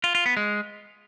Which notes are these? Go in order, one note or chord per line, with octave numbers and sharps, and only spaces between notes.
F4
F4
B3
G#3